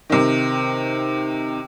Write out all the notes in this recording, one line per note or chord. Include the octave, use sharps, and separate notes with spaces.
C3 D#3